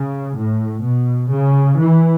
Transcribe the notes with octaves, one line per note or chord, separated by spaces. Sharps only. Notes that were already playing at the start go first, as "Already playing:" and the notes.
Already playing: C#3
A2
B2
C#3
E3